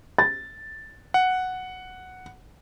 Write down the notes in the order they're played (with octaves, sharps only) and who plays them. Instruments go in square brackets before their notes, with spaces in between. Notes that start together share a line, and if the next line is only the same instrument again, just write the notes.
[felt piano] A6
[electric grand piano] F#5